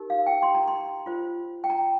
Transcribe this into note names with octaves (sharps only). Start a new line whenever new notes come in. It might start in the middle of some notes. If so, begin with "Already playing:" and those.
Already playing: D#4 G4 A#4
F5
G5
C6
A#5
C6
F4 C5
G5
A#5